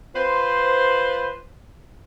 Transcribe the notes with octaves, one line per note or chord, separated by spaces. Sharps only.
F4 B4 C5